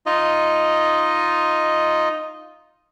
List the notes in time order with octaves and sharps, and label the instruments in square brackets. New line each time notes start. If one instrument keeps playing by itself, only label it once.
[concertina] D#4 F4 D#5